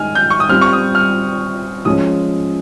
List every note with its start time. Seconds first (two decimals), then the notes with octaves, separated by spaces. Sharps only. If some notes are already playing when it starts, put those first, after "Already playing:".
Already playing: D#3 G#3 D#4 G#5 F6
0.15 G6
0.30 C#6
0.40 D#6
0.49 G3 C4 F4 F6
0.61 C#6
0.73 D#6
0.95 F6
1.85 F3 G#3 C#4 D#6